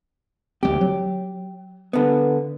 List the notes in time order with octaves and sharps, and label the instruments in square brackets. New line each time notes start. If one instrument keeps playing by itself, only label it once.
[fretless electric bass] D2 G#3 C4 [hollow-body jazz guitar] G4
[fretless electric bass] F#3
[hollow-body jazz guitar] D3 B3